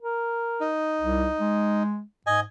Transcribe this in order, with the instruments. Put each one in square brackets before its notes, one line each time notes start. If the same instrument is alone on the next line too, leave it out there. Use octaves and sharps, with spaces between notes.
[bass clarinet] A#4
[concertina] D#4
[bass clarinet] C2
G#3
[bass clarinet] G#2 [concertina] D#5 G#5